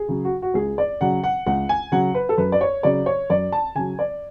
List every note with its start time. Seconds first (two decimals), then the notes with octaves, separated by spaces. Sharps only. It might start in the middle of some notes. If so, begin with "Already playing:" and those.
Already playing: G#4
0.08 C#3 F#3
0.25 F#4
0.42 F#4
0.54 C#2 G#4
0.78 D5
1.01 C#3 F#3 F#5
1.24 F#5
1.46 C#2 F#5
1.69 G#5
1.92 C#3 F#3 F#5
2.14 B4
2.29 A4
2.38 F#2 B4
2.52 D5
2.61 C#5
2.83 C#3 F#3 D5
3.06 C#5
3.30 F#2 D5
3.52 A5
3.75 C#3 F#3 G#5
3.99 D5